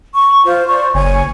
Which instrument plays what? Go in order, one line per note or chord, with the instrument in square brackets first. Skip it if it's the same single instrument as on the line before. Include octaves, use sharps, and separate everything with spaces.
[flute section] C#6
F4 C5
C5 D5 C#6
[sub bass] F#1 [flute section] C#5 G#5